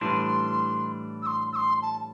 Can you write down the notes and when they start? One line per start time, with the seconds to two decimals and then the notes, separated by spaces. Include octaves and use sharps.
0.01 A2 E3 G3 D4 C6
1.22 E6
1.27 C6
1.53 E6
1.56 C6
1.82 A5